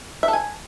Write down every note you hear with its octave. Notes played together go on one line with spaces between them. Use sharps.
E5
A4
G#5